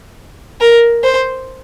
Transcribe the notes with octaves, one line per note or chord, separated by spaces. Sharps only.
A#4
C5